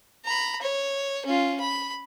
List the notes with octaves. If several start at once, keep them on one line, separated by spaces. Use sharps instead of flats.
A#5 B5
C#5
C#4 F4
B5